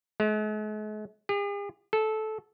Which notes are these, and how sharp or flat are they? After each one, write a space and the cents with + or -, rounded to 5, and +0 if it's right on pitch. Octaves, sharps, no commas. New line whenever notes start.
G#3 +45
G#4 -45
A4 -15